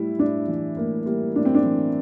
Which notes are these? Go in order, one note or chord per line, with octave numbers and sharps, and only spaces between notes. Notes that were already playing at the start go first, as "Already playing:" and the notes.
Already playing: A2 G3 E4
A2 D4
E3
A2 A#3
G3 A#3
A2 D4
C4
D4
E3